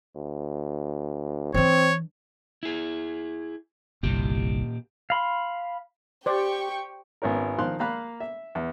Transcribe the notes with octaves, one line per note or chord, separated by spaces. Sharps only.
D2
E3 C4 D4 C#5
E4 G#4
G1 C2 A#2 G4
F5 B5 C6
G4 C5 D5 G5 C#6
G#1 B3 C#4 A#4
D#3 F3 F5 C6 F#6
A#3 F5 B5 F#6
E5
E2